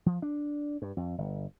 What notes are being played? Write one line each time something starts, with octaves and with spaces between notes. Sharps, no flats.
F3
D4
G2
F2
G1